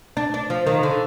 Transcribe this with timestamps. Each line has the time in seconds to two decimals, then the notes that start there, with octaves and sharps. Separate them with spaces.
0.17 D4
0.34 D4
0.50 F3
0.67 D#3
0.83 D3